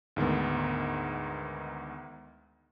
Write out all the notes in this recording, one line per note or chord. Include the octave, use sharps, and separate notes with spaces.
D2 G#2 D#3 B3